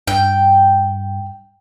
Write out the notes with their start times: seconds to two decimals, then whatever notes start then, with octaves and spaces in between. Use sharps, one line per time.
0.07 G2 G5